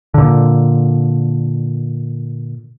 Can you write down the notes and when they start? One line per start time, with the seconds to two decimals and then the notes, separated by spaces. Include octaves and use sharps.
0.14 A#2 D3